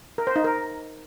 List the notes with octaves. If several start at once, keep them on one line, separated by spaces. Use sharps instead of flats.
A#4
C5
D#4
A#4